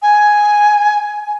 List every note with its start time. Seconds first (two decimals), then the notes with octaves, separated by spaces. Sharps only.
0.02 G#5